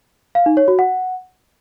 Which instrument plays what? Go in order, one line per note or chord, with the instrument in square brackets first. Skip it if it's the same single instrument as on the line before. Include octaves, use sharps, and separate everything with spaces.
[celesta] F5
D#4
C#5
F#4
F#5